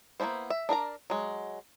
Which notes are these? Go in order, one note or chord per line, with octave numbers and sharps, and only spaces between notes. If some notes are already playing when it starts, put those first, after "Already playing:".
A#3 B3 C#4 E4 C5
E5
D4 A#4 D5 A#5
F#3 G#3